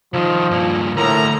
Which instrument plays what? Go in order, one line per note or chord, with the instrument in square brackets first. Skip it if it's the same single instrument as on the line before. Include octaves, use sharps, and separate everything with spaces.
[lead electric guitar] C2 D#3 [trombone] F3
[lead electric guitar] G2 A#2
[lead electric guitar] D2 [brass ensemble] A2 A#5 [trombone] A#4